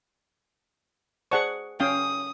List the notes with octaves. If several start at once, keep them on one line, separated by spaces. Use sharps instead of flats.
G#4 C5 D5 F#5 A5 C#6
C#4 F5 G5 D#6